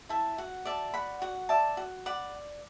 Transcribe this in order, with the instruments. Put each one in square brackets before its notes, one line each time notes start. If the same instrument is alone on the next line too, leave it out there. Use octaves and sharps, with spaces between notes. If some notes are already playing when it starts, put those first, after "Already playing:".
[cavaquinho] E4 E5 A5
F#4 F#5
D5 E5 A5
F#4 F#5 B5
F#4 F#5
D5 E5 A5
F#4
D5 F#5 B5